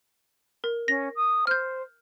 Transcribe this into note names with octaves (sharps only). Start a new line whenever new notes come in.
A#4
C#4 A#6
D#6
C5 F6 G6